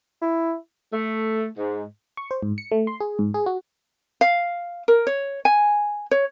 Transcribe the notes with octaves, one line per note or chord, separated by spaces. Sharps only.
E4
A3
G#2
C#6
C5
G#2
C#7
A3
C6
G#4
G#2
G#4
F#4
F5
A#4
C#5
G#5
C#5